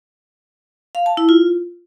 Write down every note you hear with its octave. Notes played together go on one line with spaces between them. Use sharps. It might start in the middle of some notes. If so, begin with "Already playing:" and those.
F5
A5
E4
F4